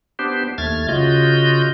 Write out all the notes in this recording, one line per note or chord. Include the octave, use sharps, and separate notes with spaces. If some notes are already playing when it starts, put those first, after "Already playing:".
B3 D4 G4 C5
D#2 A3 F6 G#6 A6
C#3 F4 F#4 D#5 G6